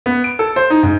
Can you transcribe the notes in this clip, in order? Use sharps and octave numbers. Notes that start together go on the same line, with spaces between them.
B3
D7
A4
C5
D#4
G#2